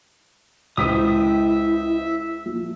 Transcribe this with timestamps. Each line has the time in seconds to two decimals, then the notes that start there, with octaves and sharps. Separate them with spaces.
0.77 C#2 E4 C5 E5 G5 D#6 B6 D#7
2.46 F3